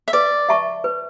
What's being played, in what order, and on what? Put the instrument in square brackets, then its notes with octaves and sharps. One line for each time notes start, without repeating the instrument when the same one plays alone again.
[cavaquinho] E5
[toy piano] B4 [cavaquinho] D5
[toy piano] E5 A5 C#6
B4